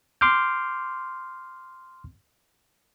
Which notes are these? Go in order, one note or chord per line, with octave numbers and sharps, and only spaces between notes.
C6 D6 F6 G6